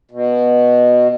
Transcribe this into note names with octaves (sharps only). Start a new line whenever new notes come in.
B2